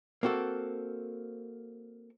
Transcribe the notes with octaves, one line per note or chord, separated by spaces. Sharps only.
A#3 C4 F#4 A4